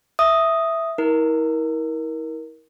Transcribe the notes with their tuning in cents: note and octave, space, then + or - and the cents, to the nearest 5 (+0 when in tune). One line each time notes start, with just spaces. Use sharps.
E5 +0 D#6 +0
E4 -40 A#4 +15